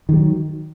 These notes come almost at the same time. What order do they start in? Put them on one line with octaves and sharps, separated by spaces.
D#3 G3 F#3